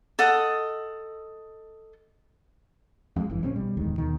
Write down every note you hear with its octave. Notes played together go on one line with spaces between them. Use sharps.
A4 D#5 F#5 D#6
F2 G3 G#3
G1 F#2 E3
A#1 C4 C#4
B2 G3
D1 E2 D#3 G#3
D#2 B2 D#3